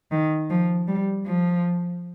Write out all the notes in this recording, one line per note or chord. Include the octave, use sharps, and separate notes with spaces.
D#3
F3
G3
F3